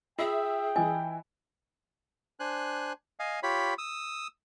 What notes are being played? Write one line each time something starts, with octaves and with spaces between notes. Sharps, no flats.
F4 G#4 E5 G5
E3 E4 D#5 G#5
D4 C5 G#5 F#6
D#5 F5 G#5
F4 G4 C#5 B5
D#6 E6